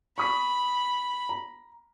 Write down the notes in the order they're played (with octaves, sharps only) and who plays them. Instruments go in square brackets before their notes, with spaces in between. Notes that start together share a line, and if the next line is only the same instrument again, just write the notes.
[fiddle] B5 [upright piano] C#6 D#6 B6
[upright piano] A#5